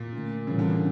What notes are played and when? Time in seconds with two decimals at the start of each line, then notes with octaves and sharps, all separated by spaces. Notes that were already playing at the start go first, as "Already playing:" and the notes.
Already playing: A#2
0.13 D3 A3 C#4
0.47 A2 C#3 E3 G3
0.59 D3
0.70 C#3